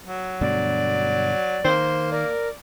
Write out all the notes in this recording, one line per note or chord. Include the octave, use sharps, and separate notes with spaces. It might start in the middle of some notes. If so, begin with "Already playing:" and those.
F#3
G2 B2 D3 D5
D#3 A#3 C5
A#4 D5